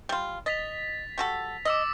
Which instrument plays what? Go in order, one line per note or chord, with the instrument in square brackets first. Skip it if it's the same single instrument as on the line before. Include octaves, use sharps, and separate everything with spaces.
[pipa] G3 F4
[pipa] D#5 [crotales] A6 B6 F7
[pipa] G3 F#4 A4
[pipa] D#5 [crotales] D6 E6 A#6